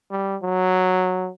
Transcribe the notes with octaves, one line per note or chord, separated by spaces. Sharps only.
G3
F#3